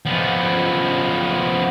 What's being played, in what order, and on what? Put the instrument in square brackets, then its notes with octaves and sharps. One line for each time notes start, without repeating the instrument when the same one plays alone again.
[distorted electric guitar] F3 B3